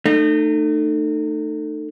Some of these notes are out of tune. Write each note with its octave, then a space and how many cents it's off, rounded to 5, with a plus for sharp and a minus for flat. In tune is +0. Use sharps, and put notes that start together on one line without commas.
A3 +20 D#4 -30